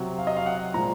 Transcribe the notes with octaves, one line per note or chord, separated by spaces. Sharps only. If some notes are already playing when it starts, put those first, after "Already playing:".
Already playing: C3 F#3
F5
D#5
F5
F#5
A#2 F3 G#3 A#5